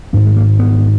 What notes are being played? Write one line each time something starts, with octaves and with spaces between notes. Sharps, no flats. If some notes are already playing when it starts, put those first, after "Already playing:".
G#1 G#2 B3
G#3
A#3
B3